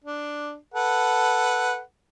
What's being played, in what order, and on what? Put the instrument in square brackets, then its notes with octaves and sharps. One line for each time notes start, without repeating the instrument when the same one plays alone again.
[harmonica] D4
A4 B4 F#5